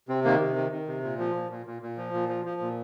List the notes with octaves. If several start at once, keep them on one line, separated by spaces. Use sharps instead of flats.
C3 C4
D#3 A#3
C3
D#3
D#3
C3
A#2
F3
A#2
A#2
A#2
A#2
F3
A#2
F3
F3
A#2